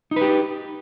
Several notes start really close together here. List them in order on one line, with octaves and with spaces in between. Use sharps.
D#4 B4 G4